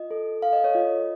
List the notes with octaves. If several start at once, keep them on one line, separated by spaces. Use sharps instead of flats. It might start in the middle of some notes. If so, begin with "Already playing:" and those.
Already playing: F4 D#5
A4
A4 F5
D#5
C#5
F4 D#5